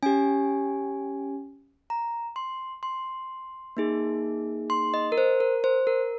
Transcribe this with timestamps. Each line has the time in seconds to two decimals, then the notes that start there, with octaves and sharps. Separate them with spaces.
0.03 C#4 G4 G#5
1.90 A#5
2.36 C6
2.83 C6
3.77 A#3 D#4 G#4
4.70 C6
4.94 D#5
5.12 A#4
5.18 C5
5.40 A#4
5.64 C5
5.87 A#4